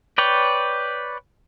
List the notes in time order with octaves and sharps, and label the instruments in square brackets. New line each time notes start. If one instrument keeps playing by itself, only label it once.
[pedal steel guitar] B4 C#5 D5 G5